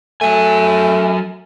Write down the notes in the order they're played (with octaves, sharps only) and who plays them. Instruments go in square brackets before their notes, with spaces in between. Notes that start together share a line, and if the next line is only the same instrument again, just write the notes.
[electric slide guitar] F#3 G#5 [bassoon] A3